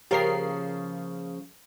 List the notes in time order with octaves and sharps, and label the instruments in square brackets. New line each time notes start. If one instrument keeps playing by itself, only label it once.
[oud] C#3 F3 A#3 [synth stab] G4 A#4 C7